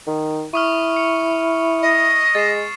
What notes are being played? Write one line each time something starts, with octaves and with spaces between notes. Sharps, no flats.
D#3
E4 C#6 D#6 F6
C#7
D#5
G#3 A6 C7 E7